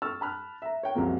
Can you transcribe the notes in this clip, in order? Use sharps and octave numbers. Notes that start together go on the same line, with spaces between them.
C#6 E6 F6 A6
A5 B5 F6 F#6
E5 A#5
C#5 G5
C2 F#2 C3 F3 G#3 A#3